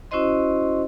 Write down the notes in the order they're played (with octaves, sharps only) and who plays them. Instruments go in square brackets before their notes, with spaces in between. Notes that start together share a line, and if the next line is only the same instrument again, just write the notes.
[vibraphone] C#4 E4 F#4 C5 D#5 C6